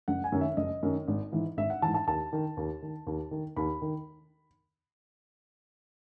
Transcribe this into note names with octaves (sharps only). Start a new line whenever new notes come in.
F#1 F#5
G#5
F#2 D#3
E5
F#1 D#5
F#2 D#3
G#1
G#2 E3
G#1 E5
F#5
G#2 E3 A5
A5
D#2 A5
D#3
D#2
D#3
D#2
D#3
D#2 B5
D#3